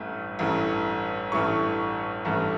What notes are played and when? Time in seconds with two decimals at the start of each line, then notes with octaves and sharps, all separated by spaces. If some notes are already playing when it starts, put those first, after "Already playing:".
Already playing: A1 G2 E3 A3
0.39 A1 G2 E3 A3
1.32 A1 G2 E3 A3 C#6
2.25 A1 G2 E3 A3